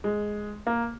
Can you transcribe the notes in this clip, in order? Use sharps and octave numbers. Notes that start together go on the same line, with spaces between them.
G#3
A#3